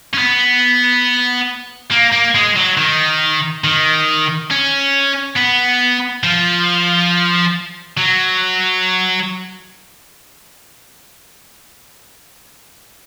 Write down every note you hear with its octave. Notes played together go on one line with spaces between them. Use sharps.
C#4
B3
A#3
A#3
G#3
F#3
D#3
D#3
C#4
B3
F3
F#3